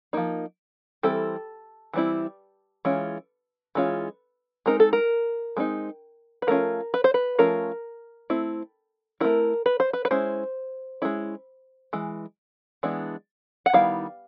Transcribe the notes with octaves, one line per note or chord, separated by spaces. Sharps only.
F3 A#3 D#4
E3 G3 C4 E4 A4
E3 G3 C4 E4
E3 G#3 C#4 F4
E3 G#3 C#4 F4
G#3 C4 D#4 A#4
A4
A#4
G#3 C4 D#4
B4
F3 A3 C#4 F4 A#4
B4
C5
B4
F3 A3 C#4 F4 A#4
A3 C4 E4
A3 C4 E4 A#4
B4
C5
B4
B4
G#3 C#4 E4 C5
G#3 C#4 E4
E3 G#3
E3 G#3 B3 D4
F#5
D#3 G3 B3 E4 F5